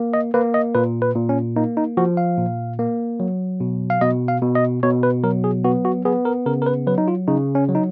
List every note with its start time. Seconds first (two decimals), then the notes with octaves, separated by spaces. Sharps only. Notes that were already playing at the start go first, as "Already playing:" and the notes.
Already playing: A#3
0.14 D#5
0.34 A#3 B4
0.54 D#5
0.75 A#2 B4
1.02 B4
1.16 A#2
1.29 C#4
1.56 A#3 D#4
1.77 D#4
1.97 F3 F#4
2.17 F5
2.38 A#2
2.79 A#3
3.20 F#3
3.60 B2
3.90 F5
4.01 B2 D#5
4.28 F5
4.42 B2
4.55 D#5
4.83 B2 C#5
5.03 B4
5.24 F#3 A#4
5.44 G#4
5.64 B3 F#4
5.85 F#4
6.05 B3 G#4
6.25 A#4
6.46 C#3 A#4
6.62 A#4
6.66 B4
6.87 F#3 B4
6.98 D#4
7.08 F4
7.27 C#3 D#4
7.55 C#4
7.68 F#3
7.75 D#4